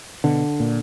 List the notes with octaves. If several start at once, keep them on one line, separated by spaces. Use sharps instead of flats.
B2 D3
A#2